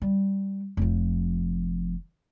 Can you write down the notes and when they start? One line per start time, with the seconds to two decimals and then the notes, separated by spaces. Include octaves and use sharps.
0.02 G3
0.77 F1 F3